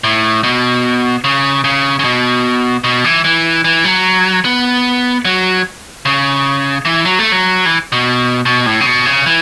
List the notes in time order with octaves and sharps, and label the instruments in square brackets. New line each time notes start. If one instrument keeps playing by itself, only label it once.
[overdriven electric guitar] A2
B2
C#3
C#3
C#3
B2
B2
E3
E3
E3
F#3
B3
F#3
C#3
E3
F#3
A3
F#3
E3
B2
B2
A2
C#3
B2
C#3
E3